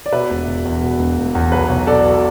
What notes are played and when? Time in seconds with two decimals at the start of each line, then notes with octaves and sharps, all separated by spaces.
0.06 D5
0.12 B2 B4 E5
0.30 E1
0.47 E1
0.65 E2
0.82 B2
0.99 E1
1.18 E1
1.35 E2
1.52 B1 B4
1.70 B1
1.87 B2 A4 D5
2.04 B2